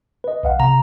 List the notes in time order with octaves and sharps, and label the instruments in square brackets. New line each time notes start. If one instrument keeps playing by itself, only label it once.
[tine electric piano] B4 D#5
B1 F5 F#5
[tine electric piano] C3 [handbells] A#5